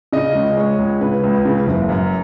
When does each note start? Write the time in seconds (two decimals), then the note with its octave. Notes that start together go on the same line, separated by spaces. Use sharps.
0.13 C#3 D#5
0.35 C#2
0.57 G#3 C#5
0.79 C#2
1.01 C#3 B4
1.24 C#2
1.45 C#3
1.67 F#1
1.89 F#2